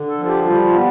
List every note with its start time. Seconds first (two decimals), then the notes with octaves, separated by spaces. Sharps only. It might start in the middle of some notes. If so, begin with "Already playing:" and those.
Already playing: D3
0.09 A4
0.18 F3
0.27 G4
0.45 G3 F4
0.64 F4
0.73 B3